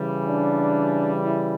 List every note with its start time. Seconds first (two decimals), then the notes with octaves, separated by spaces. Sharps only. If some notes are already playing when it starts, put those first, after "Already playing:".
Already playing: C#3 E3 G3
0.26 D4
1.23 E4